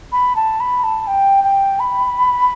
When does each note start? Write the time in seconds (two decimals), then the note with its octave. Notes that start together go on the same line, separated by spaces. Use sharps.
0.12 B5
0.36 A5
0.60 B5
0.84 A5
1.07 G5
1.44 G5
1.80 B5